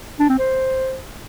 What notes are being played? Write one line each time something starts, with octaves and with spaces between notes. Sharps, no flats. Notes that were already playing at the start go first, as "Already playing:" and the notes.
D4
C4
C5